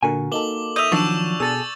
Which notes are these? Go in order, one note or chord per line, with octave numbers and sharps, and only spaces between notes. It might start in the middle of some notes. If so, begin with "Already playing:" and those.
A#2 D3 F#4 A#4 G#5
A#3 D#4 A4 D6 F#7 G7
D#5 E5 G6 F7
B2 D#3 F3 F#3 D4 C#6 E6 E7
B2 G#4 A4 E6 A6